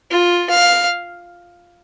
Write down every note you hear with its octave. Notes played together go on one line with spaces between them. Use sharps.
F4
F5